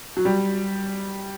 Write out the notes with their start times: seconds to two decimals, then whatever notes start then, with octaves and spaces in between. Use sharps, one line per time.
0.17 F#3
0.25 G3